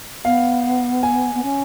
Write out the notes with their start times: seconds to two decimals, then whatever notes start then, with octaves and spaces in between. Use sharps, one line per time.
0.25 B3 F5
1.03 G#5
1.34 B3
1.43 C#4